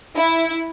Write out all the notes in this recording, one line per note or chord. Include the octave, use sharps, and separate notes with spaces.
E4